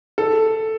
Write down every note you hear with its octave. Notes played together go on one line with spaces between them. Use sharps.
A4